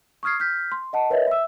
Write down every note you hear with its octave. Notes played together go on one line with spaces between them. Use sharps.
C#6 D#6 F6 G#6 C7
F6 G6 B6
C6
D#5 F#5 A5
A#4 B4 C#5 D#5 E5
E5 E6